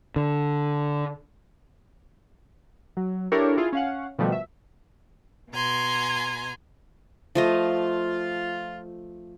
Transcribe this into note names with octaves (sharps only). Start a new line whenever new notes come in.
D3
F#3
D4 E4 G4 A4 A#4 C#5
E4 F4 G#4
C#4 F5 F#5
B2 D#3 F3 G3 A3 F#4
E5
B2 G#5 A#5 C6
F3 A3 F4 D#5